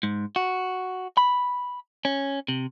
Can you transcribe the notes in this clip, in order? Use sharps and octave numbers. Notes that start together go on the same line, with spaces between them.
G#2
F#4
B5
C#4
C3